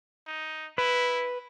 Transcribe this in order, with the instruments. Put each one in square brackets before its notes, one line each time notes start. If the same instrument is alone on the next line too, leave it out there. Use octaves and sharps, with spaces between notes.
[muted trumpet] D#4
[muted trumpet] E4 [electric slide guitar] B4